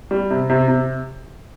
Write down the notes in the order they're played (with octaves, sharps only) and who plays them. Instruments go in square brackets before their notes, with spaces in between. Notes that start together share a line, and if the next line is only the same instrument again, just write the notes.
[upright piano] G3
C3
C3
C3